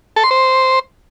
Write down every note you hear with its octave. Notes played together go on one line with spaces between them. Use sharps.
A4
C6
C5